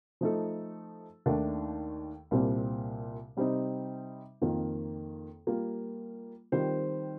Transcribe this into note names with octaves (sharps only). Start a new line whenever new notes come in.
F3 A3 D#4 A4
D#2 D#3 A3 D4 A4
C2 A#2 G3 C4
C3 G3 C4 D#4
F2 D#3 A#3 F4
G3 A#3 F4
D#3 G3 C4 F4 C5